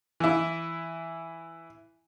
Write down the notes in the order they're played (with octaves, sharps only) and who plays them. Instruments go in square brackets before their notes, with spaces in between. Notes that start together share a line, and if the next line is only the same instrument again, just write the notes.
[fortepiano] E3 E4